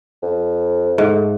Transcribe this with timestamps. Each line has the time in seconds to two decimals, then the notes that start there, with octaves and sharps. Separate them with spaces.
0.22 F2
0.98 G#2 A3